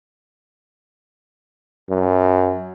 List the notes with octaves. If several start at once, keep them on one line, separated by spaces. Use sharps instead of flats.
F#2